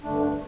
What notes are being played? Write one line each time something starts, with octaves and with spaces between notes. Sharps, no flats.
G2 D3 A3 D4